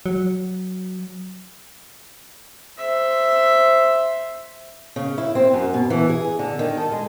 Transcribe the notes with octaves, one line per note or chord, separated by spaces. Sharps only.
F#3
C5 E5
C#3
E4
C4
F#2
B2
E3
G#4
D3
D#3
A4
G#3